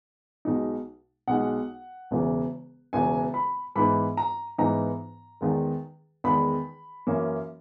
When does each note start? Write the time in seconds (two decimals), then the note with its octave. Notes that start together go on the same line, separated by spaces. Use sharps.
0.45 B1 B2 G#3 D#4
1.28 B1 B2 G#3 D#4 F#5
2.11 E1 E2 C#3 E3
2.93 E1 E2 C#3 E3 G#5
3.34 B5
3.76 G#2 E3 B3 D#4 B5
4.17 A#5
4.58 G#2 E3 B3 D#4 A#5
5.41 E2 D#3 G#3
6.24 E2 D#3 G#3 B5
7.07 F#2 E3 A#3 C#4